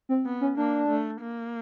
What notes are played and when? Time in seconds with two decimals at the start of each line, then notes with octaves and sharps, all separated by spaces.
0.09 C4
0.25 B3
0.41 C#4
0.57 A#3 D4
0.88 A3
1.21 A#3